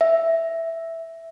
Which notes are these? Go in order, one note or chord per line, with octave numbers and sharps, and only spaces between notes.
E5